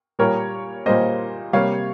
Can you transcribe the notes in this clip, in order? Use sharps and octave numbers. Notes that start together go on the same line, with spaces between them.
A#2 G3 A#3 A#4 C#5
A#2 G3 A#3 C5 D#5
C3 G3 A#3 C#5 F5